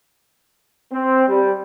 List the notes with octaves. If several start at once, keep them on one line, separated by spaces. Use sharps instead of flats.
C4
G3